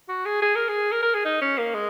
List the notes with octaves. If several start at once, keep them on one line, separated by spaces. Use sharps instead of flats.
F#4
G#4
G#4
A#4
G#4
A#4
A#4
G#4
D#4
C#4
A#3
G#3